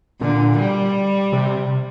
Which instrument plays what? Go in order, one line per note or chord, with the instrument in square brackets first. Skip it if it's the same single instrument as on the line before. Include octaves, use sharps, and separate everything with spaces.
[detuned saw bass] A#2 [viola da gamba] D3
[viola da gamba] G3
[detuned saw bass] C3